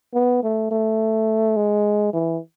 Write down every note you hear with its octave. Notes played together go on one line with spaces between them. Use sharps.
B3
A3
A3
G#3
E3